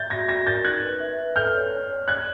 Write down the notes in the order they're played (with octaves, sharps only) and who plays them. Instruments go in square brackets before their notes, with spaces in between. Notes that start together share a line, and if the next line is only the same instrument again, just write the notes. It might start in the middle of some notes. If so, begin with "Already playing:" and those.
Already playing: [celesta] E5 [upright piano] G6 A6
[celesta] F#4 [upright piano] G#6 A#6
[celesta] F#4 [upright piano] G#6 A#6
[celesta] A#4 [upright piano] G6 A6
[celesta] D#4 [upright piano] F#6 G#6
[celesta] B4
E5
B4
[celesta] A4 [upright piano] F6 G6
[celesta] C#5
C#5
C#5
[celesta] D5 [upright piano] F#6 G#6